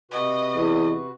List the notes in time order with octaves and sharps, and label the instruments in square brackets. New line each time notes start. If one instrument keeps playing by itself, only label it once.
[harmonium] C3 F#4 B4 [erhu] D#5
[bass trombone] E2